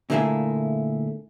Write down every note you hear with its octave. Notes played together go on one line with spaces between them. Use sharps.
A#2 D3 A3 A#3 E4 G#4